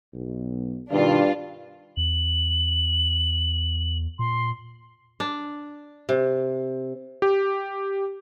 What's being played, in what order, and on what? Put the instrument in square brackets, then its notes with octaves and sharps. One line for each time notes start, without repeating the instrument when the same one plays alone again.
[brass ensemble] B1
[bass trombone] G2 [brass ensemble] B2 D#3 [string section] D4 F4
[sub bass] E2 [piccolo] F#7
[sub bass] A#2 [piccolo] C6
[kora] D4
C3
[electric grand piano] G4